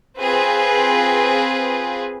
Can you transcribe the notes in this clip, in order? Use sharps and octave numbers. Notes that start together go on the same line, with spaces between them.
C4 F4 G#4 B4